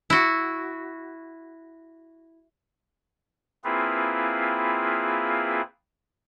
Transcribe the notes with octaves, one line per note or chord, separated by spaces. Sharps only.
E4 F#4
A#3 C4 E4 F4 G#4 B4